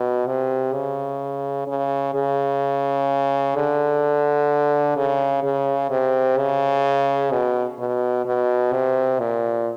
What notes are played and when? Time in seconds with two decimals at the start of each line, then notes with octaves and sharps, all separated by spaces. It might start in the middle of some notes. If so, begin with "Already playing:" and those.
Already playing: B2
0.27 C3
0.74 C#3
1.68 C#3
2.15 C#3
3.56 D3
4.97 C#3
5.44 C#3
5.91 C3
6.38 C#3
7.32 B2
7.79 B2
8.26 B2
8.73 C3
9.19 A#2